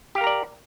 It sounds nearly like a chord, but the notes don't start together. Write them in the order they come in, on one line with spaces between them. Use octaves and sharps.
G4 F5 A#4 A#5 D5